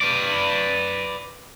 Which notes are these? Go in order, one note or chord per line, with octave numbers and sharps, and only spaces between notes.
B4 D5